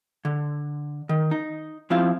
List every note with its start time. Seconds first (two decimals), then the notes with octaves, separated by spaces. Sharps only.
0.25 D3
1.09 D#3
1.31 D#4
1.90 F3 C4 E4 F4 F5